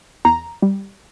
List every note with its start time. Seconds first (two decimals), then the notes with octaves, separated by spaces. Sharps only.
0.25 E2 A#5
0.62 G3